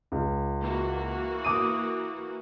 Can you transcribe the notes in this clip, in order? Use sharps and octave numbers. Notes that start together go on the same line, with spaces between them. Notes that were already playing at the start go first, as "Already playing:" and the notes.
C#2
E3 A#3 F#4
D6 D#6 D#7